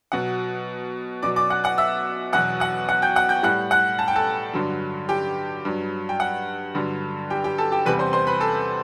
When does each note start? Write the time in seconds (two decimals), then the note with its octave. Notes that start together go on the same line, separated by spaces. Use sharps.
0.12 B2 F#3 F#5
1.22 B2 F#3 D5 D6
1.36 D5 D6
1.50 F#5 F#6
1.64 F#5 F#6
1.78 E5 E6
2.33 E2 B2 F#3 F#5 F#6
2.60 F#5 F#6
2.89 F#5 F#6
3.02 G5 G6
3.16 F#5 F#6
3.29 G5 G6
3.43 A2 G3 F#5 F#6
3.71 F#5 F#6
3.99 A5
4.08 G5
4.16 A4 A5
4.53 G2 D3 F#3
5.09 G4 G5
5.65 G2 F#3
6.09 G5
6.20 F#5
6.75 G2 D3 F#3
7.30 G4 G5
7.44 G4 G5
7.58 A4 A5
7.72 G4 G5
7.86 E2 C3 G3 B4 B5
7.99 C5 C6
8.13 C5 C6
8.27 B4 B5
8.40 A4 A5